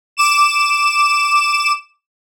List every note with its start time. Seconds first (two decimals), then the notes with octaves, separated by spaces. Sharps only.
0.17 D6 E7